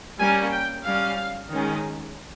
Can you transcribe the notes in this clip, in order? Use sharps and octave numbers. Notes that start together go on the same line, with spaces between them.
G3 A#3 C#4 G#5
G5
G3 C#4 F5
D#3 G#3 C#4